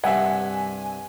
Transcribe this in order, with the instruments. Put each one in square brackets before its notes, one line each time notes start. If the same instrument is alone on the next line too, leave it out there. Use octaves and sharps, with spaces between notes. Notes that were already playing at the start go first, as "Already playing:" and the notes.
[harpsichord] C2 G2 D4 [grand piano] E5 F#5 [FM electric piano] G#5